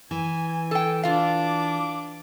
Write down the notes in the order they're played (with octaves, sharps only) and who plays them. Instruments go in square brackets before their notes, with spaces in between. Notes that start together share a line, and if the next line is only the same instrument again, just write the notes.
[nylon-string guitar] E3 [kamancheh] G#5
[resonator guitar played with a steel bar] A4 G5
[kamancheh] D4 D6 [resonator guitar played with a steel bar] F4 F5